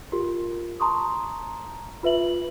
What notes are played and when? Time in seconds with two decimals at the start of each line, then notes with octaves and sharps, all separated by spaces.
0.12 F4 G4 A#4
0.80 A5 A#5 C6 C#6 D#6
2.03 F4 B4 E5 F#7